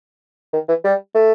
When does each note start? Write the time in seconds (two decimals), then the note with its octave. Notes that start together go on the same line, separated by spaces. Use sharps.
0.53 D#3
0.68 E3
0.84 G3
1.15 A3